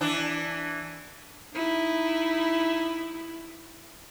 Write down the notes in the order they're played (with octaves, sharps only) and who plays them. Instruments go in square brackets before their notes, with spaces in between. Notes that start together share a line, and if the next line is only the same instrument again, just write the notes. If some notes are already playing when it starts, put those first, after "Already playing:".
[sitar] E3 D4
[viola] D#4 E4